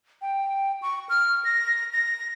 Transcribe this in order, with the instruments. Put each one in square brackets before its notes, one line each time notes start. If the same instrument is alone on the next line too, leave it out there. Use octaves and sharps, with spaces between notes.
[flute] G5
C#6
F6
A#6
A#6